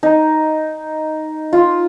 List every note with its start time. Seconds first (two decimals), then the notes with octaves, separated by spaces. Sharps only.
0.03 D#4
1.53 F4